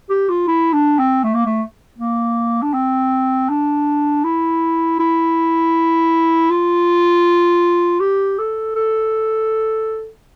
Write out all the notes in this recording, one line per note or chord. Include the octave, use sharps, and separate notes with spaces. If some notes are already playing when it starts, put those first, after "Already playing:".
G4
F4
E4
D4
C4
A3
A#3
A3
A#3
D4
C4
D4
E4
E4
F4
G4
A4
A4